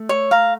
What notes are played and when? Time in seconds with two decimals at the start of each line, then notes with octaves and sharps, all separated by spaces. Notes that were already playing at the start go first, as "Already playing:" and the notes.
Already playing: A3
0.09 C#5
0.31 F5 A#5